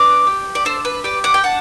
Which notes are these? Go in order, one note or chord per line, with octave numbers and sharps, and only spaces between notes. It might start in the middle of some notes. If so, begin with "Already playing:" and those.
Already playing: D4 B4 D5
G4
D5
D4 A4 C5
B4
G4 B4 D5
D5 F#5
G5
D4 F#5 A5